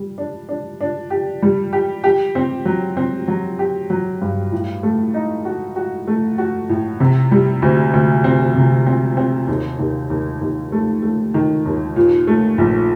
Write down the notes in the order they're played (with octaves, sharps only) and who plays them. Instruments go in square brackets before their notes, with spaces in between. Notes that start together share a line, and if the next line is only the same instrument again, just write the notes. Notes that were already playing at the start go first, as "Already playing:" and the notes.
Already playing: [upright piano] G3
D4
D4
D4
G4
G3
G4
G4
C4
F#3
C4
F#3
G4
F#3
G2
A2
A3
D#4
F#4
F#4
A3
F#4
A2
C3
G3
D2
D2
C4
C3
C4
C4
D#2
D#2
D#2
D#2
A3
A3
D#3
D#2
A#2
A3
A#1